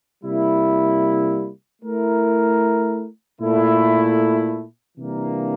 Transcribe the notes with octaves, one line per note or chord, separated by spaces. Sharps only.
C3 G3 A#3 E4
A3 E4 A#4
A#2 A3 E4
C3 E3 G3 A#3 D4